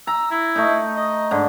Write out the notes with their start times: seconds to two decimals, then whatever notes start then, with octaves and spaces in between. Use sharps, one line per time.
0.07 A#5 E6
0.31 E4
0.56 A3 D#4
0.96 D#5
1.31 G#2 D3